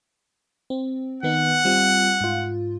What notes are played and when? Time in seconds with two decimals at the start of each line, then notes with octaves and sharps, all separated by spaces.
0.70 C4
1.23 D#3 B3 D#4 F#5
1.65 G3 C4 F4
2.21 G#2 F4